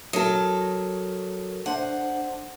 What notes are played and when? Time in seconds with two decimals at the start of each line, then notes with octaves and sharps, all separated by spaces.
0.13 F#3 A4 A#4 D#6
1.66 D4 C5 F#5